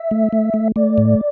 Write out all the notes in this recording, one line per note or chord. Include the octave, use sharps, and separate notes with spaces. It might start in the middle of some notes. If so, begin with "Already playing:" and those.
Already playing: E5
A3
A3
A3
A3 D5
A2